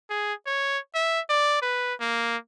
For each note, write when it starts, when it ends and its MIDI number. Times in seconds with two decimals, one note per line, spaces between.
0.10 0.33 68
0.46 0.79 73
0.95 1.20 76
1.30 1.62 74
1.62 1.94 71
2.00 2.37 58